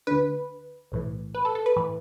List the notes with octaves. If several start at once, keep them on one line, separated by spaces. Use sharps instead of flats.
D2 D3 B4
B1 A2 E3
B4
A4
A4
B4
A2 E3